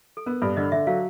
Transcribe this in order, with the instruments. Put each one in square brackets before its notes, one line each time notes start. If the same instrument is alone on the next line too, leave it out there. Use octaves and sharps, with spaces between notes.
[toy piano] A4
[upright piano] B3 [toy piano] A#4
[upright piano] G2 [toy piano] A4
[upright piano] D3 [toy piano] D#5
[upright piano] D3 [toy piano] E5
[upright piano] F#3 [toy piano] F5